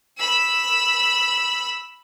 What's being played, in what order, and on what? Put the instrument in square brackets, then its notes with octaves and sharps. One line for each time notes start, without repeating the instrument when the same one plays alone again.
[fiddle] B5 E6